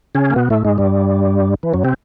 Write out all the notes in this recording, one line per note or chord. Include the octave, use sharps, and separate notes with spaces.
C#3 C#4
A#3
B2 B3
A2 A3
G#2 G#3
G2 G3
E3
F#2 F#3
C3 C4